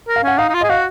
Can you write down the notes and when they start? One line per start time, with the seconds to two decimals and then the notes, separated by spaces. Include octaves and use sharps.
0.08 A#4
0.16 F5
0.23 C#4 F#5
0.38 D#4 F5
0.49 D#4
0.54 F4
0.61 G#4 D#5
0.69 F#4 F5